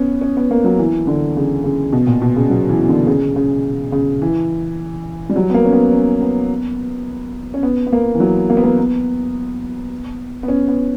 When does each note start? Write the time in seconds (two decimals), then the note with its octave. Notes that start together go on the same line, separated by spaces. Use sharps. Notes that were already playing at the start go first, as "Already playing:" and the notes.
Already playing: B3 C#4
0.21 C#4
0.37 B3
0.51 A#3
0.64 F#3
0.79 E3
1.07 D3
1.37 C#3
1.64 C#3
1.93 B2
2.07 A#2
2.22 B2
2.36 C#3
2.50 F#3
2.69 E3
2.89 D3
3.07 C#3
3.36 C#3
3.92 C#3
4.22 E3
5.29 G3
5.36 F#3
5.50 B3
5.54 A#3
5.65 C#4
5.73 B3
5.92 C#4
6.21 B3
7.54 C#4
7.63 B3
7.87 B3
7.93 A#3
8.15 E3
8.20 F#3
8.50 A#3
8.57 B3
8.64 A#3
8.78 B3
10.43 B3
10.48 C#4
10.68 B3